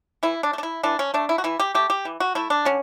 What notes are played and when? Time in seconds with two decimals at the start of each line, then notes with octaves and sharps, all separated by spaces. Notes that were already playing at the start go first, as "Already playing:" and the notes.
0.23 E3 E4
0.43 D4
0.53 A3
0.58 D4
0.63 E4
0.83 E3 D4
0.99 C#4
1.14 A3 D4
1.29 E4
1.38 F#4
1.44 E3 E4
1.60 G4
1.75 A3 G4
1.90 G4
2.05 E3
2.20 F#4
2.35 A3 E4
2.50 D4
2.65 D3 C#4